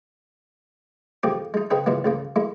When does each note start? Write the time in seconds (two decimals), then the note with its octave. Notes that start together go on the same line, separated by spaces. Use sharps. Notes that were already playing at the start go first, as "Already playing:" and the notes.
1.23 F2 C3 A#3 G4 G#4 D6
1.54 G#3 D#4
1.71 C#3 C4 D#4 G#4 B4
1.86 A#2 C#3 E3 G#3 A#3
2.04 C#2 C#3 A#3
2.36 G#3 A#3 E4